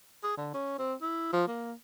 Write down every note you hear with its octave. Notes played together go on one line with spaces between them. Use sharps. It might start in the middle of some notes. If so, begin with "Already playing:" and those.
G#4
D3
C#4
C4
E4
F3
A#3